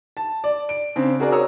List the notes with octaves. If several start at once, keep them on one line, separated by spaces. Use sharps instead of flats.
A5
D5
D7
C#3 C4 D4
F#4 G#4 A#4 D5
C#5 A#5 D#6 E6